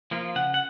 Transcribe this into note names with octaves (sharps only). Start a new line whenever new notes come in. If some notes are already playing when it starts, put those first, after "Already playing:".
F3 A#3 F4
C#3 F#5
F#5